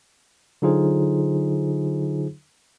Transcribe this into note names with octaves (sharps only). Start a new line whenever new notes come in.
D3 F#3 D#4 F4 G#4 C5